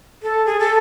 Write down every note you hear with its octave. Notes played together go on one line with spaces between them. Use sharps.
A4
G#4
A4